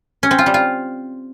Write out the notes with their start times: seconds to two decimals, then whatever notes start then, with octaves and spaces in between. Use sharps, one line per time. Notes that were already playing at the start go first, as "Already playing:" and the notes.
0.23 C#4
0.31 C4
0.38 F4
0.46 G3
0.54 F4